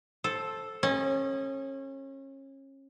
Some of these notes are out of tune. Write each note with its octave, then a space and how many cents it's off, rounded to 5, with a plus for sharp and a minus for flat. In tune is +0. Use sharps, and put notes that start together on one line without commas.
A4 +0 C5 +20
C#4 -30 D#5 +0